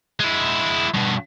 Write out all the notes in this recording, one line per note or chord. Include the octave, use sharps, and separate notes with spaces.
G#3 E4
G2 B2